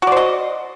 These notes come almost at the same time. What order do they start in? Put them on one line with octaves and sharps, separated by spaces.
F#4 D5 C5 D#5